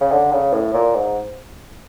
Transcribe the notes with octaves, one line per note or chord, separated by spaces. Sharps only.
C#3
D3
C#3
A2
A#2
G#2